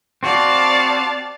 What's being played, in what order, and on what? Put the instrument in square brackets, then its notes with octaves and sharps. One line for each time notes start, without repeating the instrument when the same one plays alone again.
[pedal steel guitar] C4 F#4 [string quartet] D5 F5 A5